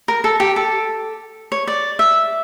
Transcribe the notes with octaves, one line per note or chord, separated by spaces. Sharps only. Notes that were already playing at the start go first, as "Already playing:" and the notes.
A#4
A4
G4
A4
C#5
D5
E5